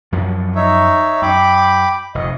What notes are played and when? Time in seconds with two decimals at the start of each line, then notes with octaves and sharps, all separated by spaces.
0.12 F#2 F3 F#3
0.56 D#4 C#5 E5
1.22 F#2 G5 B5 D6
2.15 F1 D#5